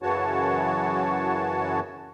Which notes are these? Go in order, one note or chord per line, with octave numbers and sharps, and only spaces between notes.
F#2 C#3 E3 F#4 C#5 A5